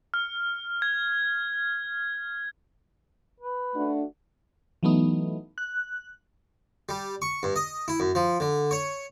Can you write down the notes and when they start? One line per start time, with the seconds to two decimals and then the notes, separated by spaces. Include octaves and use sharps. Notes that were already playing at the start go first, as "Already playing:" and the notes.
0.14 F6
0.82 G#6
3.40 B4
3.75 A3 D4 F#4
4.83 E3 F#3 A3 B3 D#4
5.58 F#6
6.89 G3
7.22 C#6
7.43 G2
7.56 D#5
7.88 E4
8.00 F#2
8.15 F3
8.40 D3
8.71 C#5